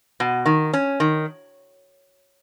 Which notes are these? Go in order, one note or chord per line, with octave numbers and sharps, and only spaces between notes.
B2
D#3
C#4
D#3